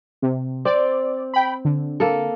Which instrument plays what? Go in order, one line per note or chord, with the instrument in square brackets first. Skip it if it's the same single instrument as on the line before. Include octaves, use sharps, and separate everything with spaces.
[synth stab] C3
[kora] C4 [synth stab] D5
[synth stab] G5 B5
D3
[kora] A#3 A4